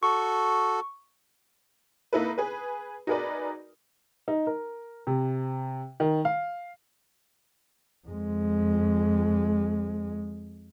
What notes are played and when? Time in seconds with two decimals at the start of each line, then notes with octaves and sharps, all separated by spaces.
0.03 F#4 A4 C#6
2.13 A#3 D#4 E4 A4 B4
2.38 G#4 B4
3.07 D#4 F#4 G#4 A#4 B4 D5
4.28 D#4
4.47 A#4
5.07 C3
6.00 D#3
6.25 F5
8.07 F2 G#3